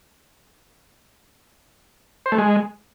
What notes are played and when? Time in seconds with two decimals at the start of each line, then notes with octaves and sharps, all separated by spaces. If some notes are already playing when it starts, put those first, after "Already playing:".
2.26 C5
2.32 A3
2.38 G#3